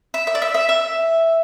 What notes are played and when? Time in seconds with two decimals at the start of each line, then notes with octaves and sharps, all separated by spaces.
0.14 E5
0.27 E5
0.35 D5
0.42 E5
0.54 E5
0.69 E5